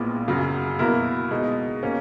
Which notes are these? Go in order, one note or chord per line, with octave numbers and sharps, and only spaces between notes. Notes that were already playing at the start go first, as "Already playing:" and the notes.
Already playing: A#1 A#2 G#3 B3 E4
F#2 C#3 F#3
B2 A#3 E4 A#4
B2 G#3 D#4
B2 A#3 C#4